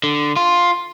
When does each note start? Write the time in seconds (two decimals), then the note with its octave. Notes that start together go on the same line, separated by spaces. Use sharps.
0.04 D3
0.36 F4